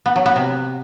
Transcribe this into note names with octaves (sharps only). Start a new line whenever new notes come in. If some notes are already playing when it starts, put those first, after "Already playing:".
B3
F#3
B3
C3